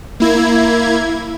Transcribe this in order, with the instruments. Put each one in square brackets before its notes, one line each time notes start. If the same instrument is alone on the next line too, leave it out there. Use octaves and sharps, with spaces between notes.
[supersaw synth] A#3 E4 G#6